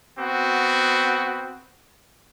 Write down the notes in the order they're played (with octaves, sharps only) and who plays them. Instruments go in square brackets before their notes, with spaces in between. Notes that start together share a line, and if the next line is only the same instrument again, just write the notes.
[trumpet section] B3 C4 F#4